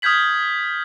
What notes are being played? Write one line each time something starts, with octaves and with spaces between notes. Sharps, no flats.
D#6 F6 G6 G#6 B6 F#7